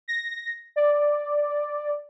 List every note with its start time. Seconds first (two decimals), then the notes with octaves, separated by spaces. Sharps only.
0.08 A#6
0.76 D5